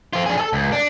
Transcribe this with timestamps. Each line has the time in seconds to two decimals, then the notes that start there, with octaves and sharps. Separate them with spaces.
0.13 C4 F4
0.26 D4 G#4
0.38 G#4 A4
0.53 C#2
0.72 D4